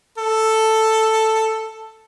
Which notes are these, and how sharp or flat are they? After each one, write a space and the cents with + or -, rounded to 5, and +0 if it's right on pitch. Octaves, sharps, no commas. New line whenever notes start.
A4 +5